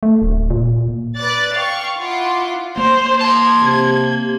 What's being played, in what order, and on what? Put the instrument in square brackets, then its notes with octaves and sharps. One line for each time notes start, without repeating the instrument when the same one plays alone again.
[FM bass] A3
D1
A#2
[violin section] B4 D5 F#6 A6
F5 G5 C#6
E4 F4 F#5 C6 D6
[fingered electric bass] A#3 [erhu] C5
[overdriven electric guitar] A5 C6 [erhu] G#6
[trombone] C3